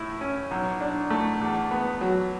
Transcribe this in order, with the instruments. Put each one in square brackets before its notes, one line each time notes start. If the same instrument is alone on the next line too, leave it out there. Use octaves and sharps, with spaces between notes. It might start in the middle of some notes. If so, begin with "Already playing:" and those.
Already playing: [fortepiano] A2 E4
C#4
B1
D4
A3
E2
B3
F#3